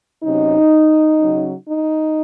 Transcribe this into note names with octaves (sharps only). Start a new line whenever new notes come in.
C3 F#3 C#4 D#4
C#3 F#3 C#4
D#4